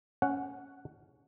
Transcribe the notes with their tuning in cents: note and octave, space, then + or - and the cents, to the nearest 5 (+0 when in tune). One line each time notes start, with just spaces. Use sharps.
C#4 +10 F#5 +0